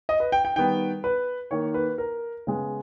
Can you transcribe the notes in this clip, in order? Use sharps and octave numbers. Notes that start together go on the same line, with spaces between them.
D#5
B4
G5
G5
D#3 G3 B3 G5
B4
D#3 A#3 C#5
B4
A#4
C#3 G#3 B3